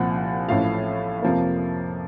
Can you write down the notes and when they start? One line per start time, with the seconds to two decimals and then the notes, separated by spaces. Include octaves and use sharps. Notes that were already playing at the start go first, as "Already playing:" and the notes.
Already playing: C2 A#2 F3 F#5
0.48 A1 A2 F3 A3 F5
1.22 F2 C3 F3 A#3